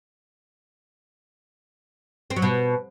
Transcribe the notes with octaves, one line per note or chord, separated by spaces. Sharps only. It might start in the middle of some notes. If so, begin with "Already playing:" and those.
C4
F#3
B2